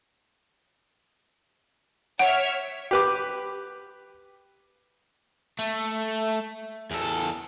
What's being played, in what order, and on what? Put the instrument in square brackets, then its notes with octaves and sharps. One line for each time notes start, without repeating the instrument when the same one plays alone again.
[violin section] C#5 E5 F6 [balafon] F#5
[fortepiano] G4 B4 D6
[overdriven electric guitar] A3
E2 A4